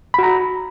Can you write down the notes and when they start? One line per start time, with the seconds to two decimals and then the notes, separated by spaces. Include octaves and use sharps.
0.14 B5
0.19 F#4
0.23 A#5